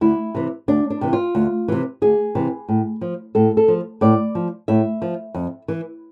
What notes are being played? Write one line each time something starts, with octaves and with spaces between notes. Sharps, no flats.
D2 E4
C3 E3
D2 D4
D4
C3 E3
F4
D2
C3 E3
D2 G#4
C3 E3
A2
F3
A2 A4
A4
F3
A2 D5
F3
A2 E5
F3
F2
E3